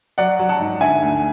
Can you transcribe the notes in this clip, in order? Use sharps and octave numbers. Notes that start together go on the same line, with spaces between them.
F#3 D5 F#5
F#3
F#5 A5
G#2
D3 E5 G#5
D2